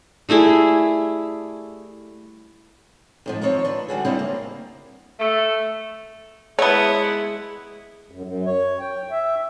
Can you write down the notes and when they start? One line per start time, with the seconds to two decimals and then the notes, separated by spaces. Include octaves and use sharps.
0.29 G3 A3 E4 G#4
3.26 F2 G#2 F3
3.41 D#3 F3 C4 C#5
3.65 D4 B4
3.88 D3 G3 F#4 G#4
4.05 C#3 G3 C4 D4 E4 D#5
4.19 A#3
5.20 A3
6.59 G#3 A3 B3 E4 C#5 F#5
8.11 F#2
8.24 F#2
8.46 C#5
8.80 G5
9.11 E5